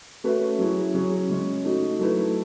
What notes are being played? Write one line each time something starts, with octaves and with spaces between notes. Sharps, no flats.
A3 C#4 F#4 B4 E5
F#3 C#4 E4 G#4
C#3 F#3 C#4 G#4
C#3 G#3 C#4
A3 D#4 F#4
F#3 A3 E4 B4